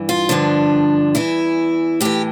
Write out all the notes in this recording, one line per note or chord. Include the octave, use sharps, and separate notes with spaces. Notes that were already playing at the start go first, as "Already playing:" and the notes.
Already playing: G2 E3
F4
G2 D3 F3 D4
E2 E3 E4
A2 E3 G4